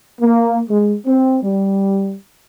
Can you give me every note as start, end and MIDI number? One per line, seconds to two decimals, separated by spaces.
0.21 0.60 58
0.70 0.95 56
1.06 1.38 60
1.44 2.16 55